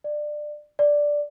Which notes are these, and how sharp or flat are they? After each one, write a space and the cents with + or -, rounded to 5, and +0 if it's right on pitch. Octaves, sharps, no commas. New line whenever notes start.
D5 +20
D5 +0